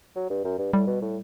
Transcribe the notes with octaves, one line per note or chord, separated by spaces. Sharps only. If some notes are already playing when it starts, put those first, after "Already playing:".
F#3
G2
F#2
G2
A2 G3
B2
A2